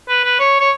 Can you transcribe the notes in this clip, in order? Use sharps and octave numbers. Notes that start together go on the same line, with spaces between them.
B4
B4
C#5
C#5